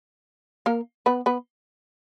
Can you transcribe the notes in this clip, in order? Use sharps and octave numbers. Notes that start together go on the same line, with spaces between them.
A#3 A#4
B3 B4
B3 B4